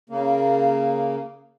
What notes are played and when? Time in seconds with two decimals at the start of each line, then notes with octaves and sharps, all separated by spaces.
0.10 C#3 A#3